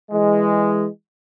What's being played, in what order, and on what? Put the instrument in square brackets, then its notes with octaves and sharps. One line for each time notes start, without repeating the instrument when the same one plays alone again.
[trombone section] E3 G#3